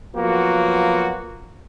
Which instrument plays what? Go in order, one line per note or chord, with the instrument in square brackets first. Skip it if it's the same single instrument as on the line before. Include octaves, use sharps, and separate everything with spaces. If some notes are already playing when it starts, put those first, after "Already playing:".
[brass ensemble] F3 F#3 A#3 B3 F4 F#4